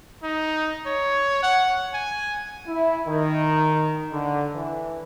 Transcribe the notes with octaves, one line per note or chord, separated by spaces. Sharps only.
D#4
C#5
F#5
G#5
E4
D#3
D3
E3